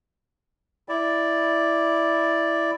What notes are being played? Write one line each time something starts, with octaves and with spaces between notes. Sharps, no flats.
E4 D5